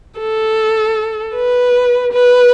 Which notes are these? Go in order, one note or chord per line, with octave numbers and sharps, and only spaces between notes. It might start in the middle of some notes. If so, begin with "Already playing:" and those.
A4
B4
B4